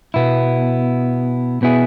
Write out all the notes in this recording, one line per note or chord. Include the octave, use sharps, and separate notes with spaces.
B2 B3 E4
B2 B3 E4 G#4